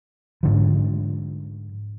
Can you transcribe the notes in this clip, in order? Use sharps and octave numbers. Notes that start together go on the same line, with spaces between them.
G#2 D3 F3